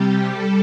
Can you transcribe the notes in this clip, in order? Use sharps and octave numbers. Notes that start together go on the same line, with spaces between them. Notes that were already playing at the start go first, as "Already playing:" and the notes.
Already playing: C3 G3 G4
G3 A4